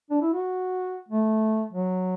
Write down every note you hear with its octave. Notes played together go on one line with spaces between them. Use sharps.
D4
E4
F#4
A3
F#3